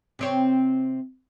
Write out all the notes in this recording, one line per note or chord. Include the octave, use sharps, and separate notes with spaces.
C3 C4 C#5